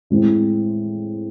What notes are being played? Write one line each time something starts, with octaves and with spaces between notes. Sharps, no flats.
A2 G#3 C4 E4